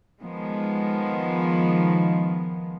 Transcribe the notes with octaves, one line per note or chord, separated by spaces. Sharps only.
D#3 F3 G#3 B3